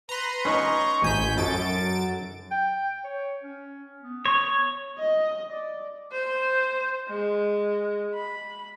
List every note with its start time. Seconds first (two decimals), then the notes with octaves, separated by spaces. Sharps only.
0.09 B4 A#5 C6
0.45 C#4 D#4 B4 C#6
1.02 A1 G#5 G6 B6
1.37 F#2 A4 A6 D7
2.51 G5
3.04 C#5
3.43 C#4
4.02 B3
4.26 C#5
4.99 D#5
5.50 D5
6.12 C5
7.09 G#3
8.14 B5